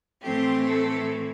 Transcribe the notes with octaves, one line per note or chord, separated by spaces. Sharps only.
A2 E3 A3 C4 G4
A3 A4